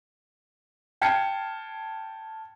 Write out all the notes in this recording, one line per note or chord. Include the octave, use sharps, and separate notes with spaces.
G5 A5 F6 G#6 C7 C#7